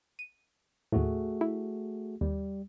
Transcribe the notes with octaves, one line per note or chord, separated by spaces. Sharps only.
D#7
D#2 A2 A3 F#4 G#4
E4
D#2 G3